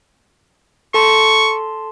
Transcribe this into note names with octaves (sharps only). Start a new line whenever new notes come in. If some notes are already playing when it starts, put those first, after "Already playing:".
A4 A5 C6 C#6